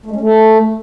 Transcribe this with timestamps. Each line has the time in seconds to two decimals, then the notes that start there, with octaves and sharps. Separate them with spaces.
0.06 A3
0.11 G#3
0.16 C#4
0.21 A3